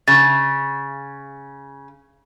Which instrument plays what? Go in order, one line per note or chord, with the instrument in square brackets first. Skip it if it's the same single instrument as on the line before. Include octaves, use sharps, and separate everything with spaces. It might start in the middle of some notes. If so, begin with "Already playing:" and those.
[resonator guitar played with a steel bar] C#3 [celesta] C#6 A6